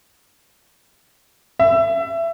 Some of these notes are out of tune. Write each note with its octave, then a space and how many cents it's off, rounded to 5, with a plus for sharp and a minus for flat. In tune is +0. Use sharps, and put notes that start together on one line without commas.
E5 +20